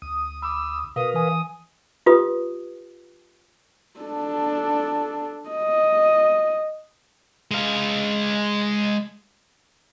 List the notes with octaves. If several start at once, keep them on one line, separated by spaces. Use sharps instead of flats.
D2 D#6
B5 D6 E6
B2 A#4 B4 F5 D#6
E3 G#5 D#6
F4 G4 B4 D#6
D4 A4
D#5
G#3 F5